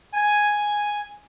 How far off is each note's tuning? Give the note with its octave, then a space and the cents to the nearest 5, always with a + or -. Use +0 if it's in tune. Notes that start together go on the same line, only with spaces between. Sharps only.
G#5 +0